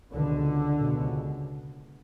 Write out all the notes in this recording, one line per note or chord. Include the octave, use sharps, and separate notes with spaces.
C#2 B2 D3
C#2 B2